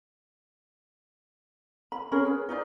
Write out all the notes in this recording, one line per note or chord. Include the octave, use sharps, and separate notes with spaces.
B5
C#4 G#4 A#4 B5
G#4 B4
D#4 F4 C5 D5